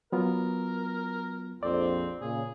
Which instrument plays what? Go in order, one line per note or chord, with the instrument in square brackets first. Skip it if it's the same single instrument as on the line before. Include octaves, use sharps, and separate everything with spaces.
[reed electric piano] F#3 B3 F4 [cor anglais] A#4
[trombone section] A#1 F2 [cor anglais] C4 [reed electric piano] D5
[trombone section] A#2 C#3 [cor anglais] G#4